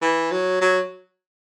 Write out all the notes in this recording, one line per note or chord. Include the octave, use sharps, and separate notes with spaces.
E3
F#3
F#3